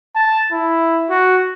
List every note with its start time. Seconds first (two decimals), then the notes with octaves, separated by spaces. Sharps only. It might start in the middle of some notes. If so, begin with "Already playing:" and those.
0.16 A5
0.52 E4
1.10 F#4